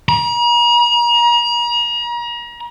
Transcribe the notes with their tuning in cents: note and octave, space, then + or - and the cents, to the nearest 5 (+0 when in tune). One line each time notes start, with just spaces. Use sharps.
A#5 +40